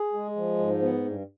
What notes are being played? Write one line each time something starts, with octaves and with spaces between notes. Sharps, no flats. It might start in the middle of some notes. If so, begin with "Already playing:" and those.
Already playing: G#4
G#3
F3
G#2
B3
G2